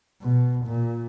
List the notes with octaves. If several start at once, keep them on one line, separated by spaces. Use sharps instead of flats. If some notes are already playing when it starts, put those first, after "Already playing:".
B2
A#2